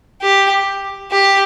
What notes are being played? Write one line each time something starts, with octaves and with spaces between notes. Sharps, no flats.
G4
G4